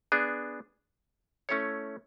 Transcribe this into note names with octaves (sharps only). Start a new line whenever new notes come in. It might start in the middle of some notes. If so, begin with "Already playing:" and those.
B3 D4 G#4
A3 C#4 E4 A4 C#5